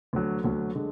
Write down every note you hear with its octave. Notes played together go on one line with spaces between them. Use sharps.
D2 D3 F#3
D2 D3 F#3
D3 G#3